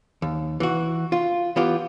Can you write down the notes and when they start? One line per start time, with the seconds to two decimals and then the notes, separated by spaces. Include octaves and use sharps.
0.22 D#2
0.60 E3 F#4
1.12 F4
1.56 E3 B3 F4 G4